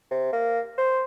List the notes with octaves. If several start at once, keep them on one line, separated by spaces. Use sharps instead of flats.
C3
A#3
C5